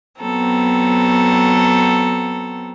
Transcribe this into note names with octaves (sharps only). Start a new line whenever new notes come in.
F#3 B3 C4 A4 A#5